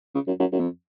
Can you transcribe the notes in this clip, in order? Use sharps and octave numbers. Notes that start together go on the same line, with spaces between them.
C#3
F#2
F#2
F#2
F2